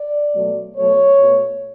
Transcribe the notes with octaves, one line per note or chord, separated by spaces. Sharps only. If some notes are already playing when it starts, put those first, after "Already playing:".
Already playing: D5
B2 F#3 A3
B2 F#3 A3 C#5
B2 A3